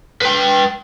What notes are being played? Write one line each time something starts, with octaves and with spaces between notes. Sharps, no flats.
B4 G5